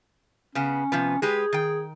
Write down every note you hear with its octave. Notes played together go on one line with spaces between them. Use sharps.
C#3 B3 C#4
C3 F3 B3
G#3 G4 G#4 B4
D#3 G5